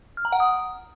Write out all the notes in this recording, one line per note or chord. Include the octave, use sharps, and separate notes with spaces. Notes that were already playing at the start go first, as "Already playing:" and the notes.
F6
A#5
F#5
D#6